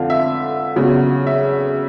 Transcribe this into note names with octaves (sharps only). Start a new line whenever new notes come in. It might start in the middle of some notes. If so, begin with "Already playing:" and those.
Already playing: F2 D3 F3 F5
E5
E2 C#3 F#3
E5